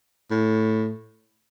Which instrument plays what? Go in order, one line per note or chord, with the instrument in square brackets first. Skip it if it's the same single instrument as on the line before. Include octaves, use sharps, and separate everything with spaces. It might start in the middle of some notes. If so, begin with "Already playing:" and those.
[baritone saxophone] A2